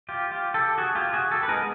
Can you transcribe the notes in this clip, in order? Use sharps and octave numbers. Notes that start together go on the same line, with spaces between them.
F4 G4
F4 G4
G4 A4
F#4 G#4
F4 G4
F#4 G#4
G4 A4
B4
G#3 B3 D#4 G#4 A#4